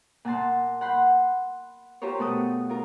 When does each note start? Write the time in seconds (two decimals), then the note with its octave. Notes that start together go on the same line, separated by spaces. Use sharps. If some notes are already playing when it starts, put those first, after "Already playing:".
0.25 A#2 F#5 A5 C6
0.81 F#5 B5 C6 G6
2.02 F4 G4 A#4 C5 C#5
2.19 B2 A3 A4 D#6
2.69 F4 A#4